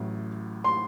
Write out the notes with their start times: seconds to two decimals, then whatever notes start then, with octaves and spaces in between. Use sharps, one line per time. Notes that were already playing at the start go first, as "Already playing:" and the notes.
Already playing: A1 A2 F#3
0.64 C6